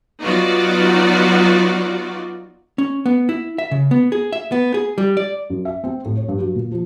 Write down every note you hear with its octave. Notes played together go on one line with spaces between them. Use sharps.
F#3 B3 D#4 F4 F#4 D5
C#4
B3
E4
E5
C#3
B3
G#4
E5
B3
G#4
G3
D5
F#2
E5
C4
A2
C#5
G2
F#3
A#2
F3